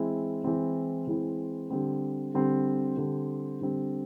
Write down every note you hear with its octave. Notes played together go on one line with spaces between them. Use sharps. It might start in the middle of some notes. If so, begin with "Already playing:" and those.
Already playing: E3 G#3 C4 E4
E3 G#3 C4 E4
E3 G#3 C4 E4
D3 G3 C4
D3 G3 C4
D3 G3 C4
D3 G3 C4